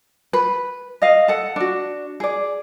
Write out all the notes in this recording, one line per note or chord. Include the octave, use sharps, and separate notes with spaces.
B4
D#5 F5
A4 F#5
D4 F#4
G#4 D5